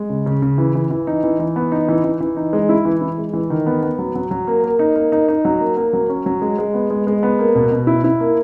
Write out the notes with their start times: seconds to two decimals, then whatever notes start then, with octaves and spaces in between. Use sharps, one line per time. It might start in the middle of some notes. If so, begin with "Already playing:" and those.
Already playing: G#3
0.09 C#3
0.26 C#3
0.42 C#3
0.58 E3
0.75 E3
0.91 E3
1.07 D#4
1.24 E3
1.40 E3
1.56 B3
1.72 D#4
1.89 E3
2.04 E3
2.21 E3
2.37 D#4
2.53 G#3
2.69 E4
2.85 E3
3.02 E4
3.18 G#3
3.33 E3
3.50 D#3
3.66 B3
3.83 B3
3.99 F#3
4.15 F#3
4.31 F#3
4.47 A#3
4.64 A#3
4.79 D#4
4.96 A#3
5.12 D#4
5.28 D#4
5.45 F#3
5.61 A#3
5.77 A#3
5.93 F#3
6.10 C#4
6.26 F#3
6.42 G#3
6.58 G#3
6.74 B3
6.90 G#3
7.07 G#3
7.23 B3
7.39 A#3
7.55 B2
7.71 B2
7.87 E4
8.04 E4
8.20 A#3